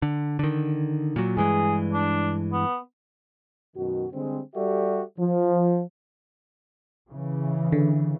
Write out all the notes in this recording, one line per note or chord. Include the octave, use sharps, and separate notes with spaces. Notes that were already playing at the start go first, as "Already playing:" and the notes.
D3
D3 D#3
A#2 F#3
G2 E3 G#3 G#4
D4
B3
F#2 B2 D#3 F#4
D3 G3 G#3 C4
G3 F#4 G4 A4 D5 E5
F3
C#3 E3
D3